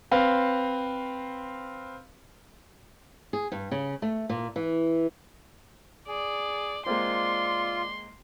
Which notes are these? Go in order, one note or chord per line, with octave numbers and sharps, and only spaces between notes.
C4 B4 F5
G#4
G2
C#3
A3
A#2
E3
G#4 D5
G#3 A#3 C4 F4 D5 C6